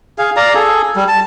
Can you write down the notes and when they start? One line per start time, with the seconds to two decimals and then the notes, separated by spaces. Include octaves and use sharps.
0.18 G#4 F5
0.36 D5 F5 A#5
0.55 G#4 A4
0.96 G3
1.08 A5